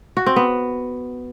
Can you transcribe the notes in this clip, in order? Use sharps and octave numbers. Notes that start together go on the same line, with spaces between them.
F#4
C4
B3